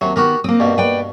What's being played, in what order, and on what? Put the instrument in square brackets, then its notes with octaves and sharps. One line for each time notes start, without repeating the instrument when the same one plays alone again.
[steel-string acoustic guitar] D#2 [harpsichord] C3 F#3
[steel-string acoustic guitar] D#3 B3 [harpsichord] F#4 G4 A#4
[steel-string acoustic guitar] A#3 C4 [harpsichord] D#6
[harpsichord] G2 B2
[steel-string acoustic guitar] B4 D5 G5